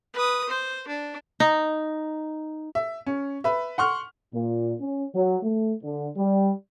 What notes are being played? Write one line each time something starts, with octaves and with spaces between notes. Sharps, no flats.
B4 D#6
C5
D4
D#4
E5
C#4
B4 E5
F#5 C6 C#6 F6
A#2
C#4
F#3
A3
D3
G3